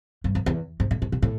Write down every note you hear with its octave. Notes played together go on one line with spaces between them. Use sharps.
G2
F#2
E2
G#2
A2
A2
A#2
A2